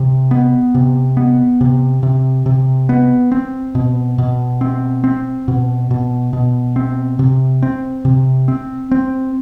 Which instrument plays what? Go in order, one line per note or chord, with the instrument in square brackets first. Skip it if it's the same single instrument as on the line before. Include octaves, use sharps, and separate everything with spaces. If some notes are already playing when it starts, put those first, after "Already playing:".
Already playing: [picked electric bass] C3
B3
C3
B3
C3
C3
C3
B3
C4
B2
B2
C4
C4
B2
B2
B2
C4
C3
C4
C3
C4
C4